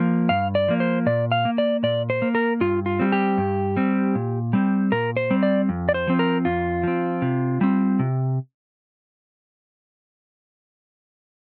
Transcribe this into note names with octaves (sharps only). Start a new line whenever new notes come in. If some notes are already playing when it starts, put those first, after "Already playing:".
Already playing: F3 A#3
G2 F5
D5
F3 A#3
C5
A#2 D5
F5
A#3
D5
A#2 D5
C5
A#3
A#4
G2 F4
F4
G3 C4
G4
G2
G3 C4
A#2
G3 C4
A#2 A#4
C5
G3 C4
D5
F2
D5
C5
F3 C4
A#4
F2 F4
F3 C4
C3
G3 C4
C3